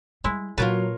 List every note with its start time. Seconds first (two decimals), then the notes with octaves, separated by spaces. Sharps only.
0.24 G3 G#3 E4
0.58 A#2 F#3 F4 A#4 B4 C#5 A5